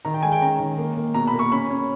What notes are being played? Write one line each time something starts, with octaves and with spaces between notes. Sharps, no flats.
D#3 A#5
G5
G#3 G#5
G5
C#4 A#5
D#3
A#3
A#3
B2 A#5
B5
A#3
C#6
C#4 B5
C#4